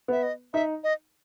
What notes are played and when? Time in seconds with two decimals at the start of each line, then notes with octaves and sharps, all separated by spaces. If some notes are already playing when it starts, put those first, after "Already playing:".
0.08 B3 E5
0.23 D#5
0.53 D#4 E5
0.84 D#5